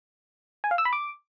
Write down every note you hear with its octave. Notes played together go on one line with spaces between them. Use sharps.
G#5
F5
E6
B5
D6